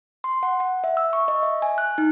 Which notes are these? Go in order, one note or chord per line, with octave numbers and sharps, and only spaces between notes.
C6
F#5
F#5
E5
E6
C#6
D#5
E5
G#5
F#6
D#4